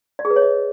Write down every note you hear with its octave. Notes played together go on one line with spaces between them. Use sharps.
D5
G#4
B4
C#5
D#5